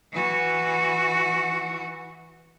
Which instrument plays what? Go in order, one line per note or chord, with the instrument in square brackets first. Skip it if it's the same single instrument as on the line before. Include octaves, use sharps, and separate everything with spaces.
[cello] E3 F#4